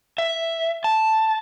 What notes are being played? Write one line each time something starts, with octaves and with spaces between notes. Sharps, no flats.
E5
A5